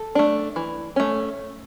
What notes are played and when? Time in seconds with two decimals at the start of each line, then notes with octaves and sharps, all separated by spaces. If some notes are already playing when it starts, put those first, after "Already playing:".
Already playing: A4
0.15 A3 D4
0.56 E3
0.96 A3 C#4